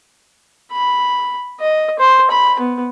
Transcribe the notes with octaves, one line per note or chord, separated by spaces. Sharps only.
B5
D#5
C5
B5
B3